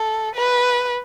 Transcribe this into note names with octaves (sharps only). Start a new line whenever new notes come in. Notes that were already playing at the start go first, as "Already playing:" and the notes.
Already playing: A4
B4